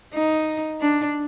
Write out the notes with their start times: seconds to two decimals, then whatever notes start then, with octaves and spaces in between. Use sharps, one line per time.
0.14 D#4
0.81 D4